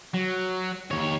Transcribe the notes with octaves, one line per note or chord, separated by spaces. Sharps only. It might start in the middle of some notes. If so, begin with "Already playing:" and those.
F#3
D#2 C#5